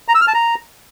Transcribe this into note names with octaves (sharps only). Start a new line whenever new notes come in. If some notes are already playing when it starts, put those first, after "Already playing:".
A#5
E6
F6
A5
A#5